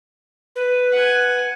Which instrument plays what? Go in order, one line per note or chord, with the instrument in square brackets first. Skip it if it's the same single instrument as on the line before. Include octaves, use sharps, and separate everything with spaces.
[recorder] B4
[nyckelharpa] F#5 G#5